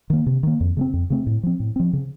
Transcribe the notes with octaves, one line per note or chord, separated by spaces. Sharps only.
D#3 A#3
C3
D#3 A#3
F2
C#3 A3 C4
F2
C#3 A3 C4
A2
F3 C4
A2
F3 C4
C#3